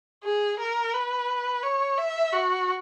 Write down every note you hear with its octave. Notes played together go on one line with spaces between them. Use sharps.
G#4
A#4
B4
C#5
E5
F#4